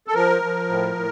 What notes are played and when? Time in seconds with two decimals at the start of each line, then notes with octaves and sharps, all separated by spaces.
0.07 A4
0.15 F3 A#4
0.43 F3
0.69 A2
0.95 A2